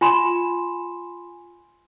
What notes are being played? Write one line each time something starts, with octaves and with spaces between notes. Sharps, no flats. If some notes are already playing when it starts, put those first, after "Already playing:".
F4 G#5 B5 C6 E7